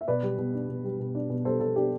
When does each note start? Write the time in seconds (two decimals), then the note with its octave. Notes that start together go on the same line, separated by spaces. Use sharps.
0.01 E5
0.08 B2 B4 D5
0.23 G3
0.38 B2
0.54 D4
0.69 B2
0.84 G3
1.00 B2
1.15 D4
1.30 B2
1.45 G3 A4 C5
1.60 B2 A4
1.76 D4 G4